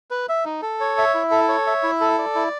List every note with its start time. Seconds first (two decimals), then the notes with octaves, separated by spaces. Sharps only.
0.11 B4
0.29 E5
0.45 D#4
0.62 A4
0.80 C#5
0.98 E5
1.14 E4
1.31 A4
1.48 C#5
1.67 E5
1.83 E4
2.01 A4
2.18 D5
2.35 E4